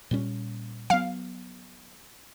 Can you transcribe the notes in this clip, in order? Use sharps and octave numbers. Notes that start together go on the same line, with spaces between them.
A#2 G3 C#4
F#3 B3 F5